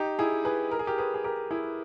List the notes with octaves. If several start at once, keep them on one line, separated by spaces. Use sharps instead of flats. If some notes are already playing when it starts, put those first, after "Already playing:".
Already playing: D#4 G4
E4 G#4
G#4 B4
A#4
G#4
G4 A#4
G#4 B4
G#4
G4 A#4
E4 G#4